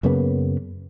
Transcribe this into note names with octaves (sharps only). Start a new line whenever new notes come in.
F#2 C#3 A#3 B3